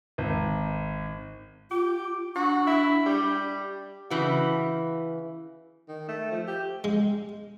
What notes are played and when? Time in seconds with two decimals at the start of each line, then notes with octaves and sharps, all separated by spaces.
0.18 G#1
1.71 F4 G4
2.35 D4 F#4
2.67 E4
3.06 G3
4.10 C#3 E3 F#4
5.89 D#3
6.08 A3
6.31 F3
6.47 G4
6.84 G#3